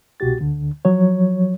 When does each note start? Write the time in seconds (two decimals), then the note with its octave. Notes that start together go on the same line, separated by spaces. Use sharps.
0.20 C2 B2 F#4 G4 A6
0.39 D2 D3
0.85 F3 F#3 C#5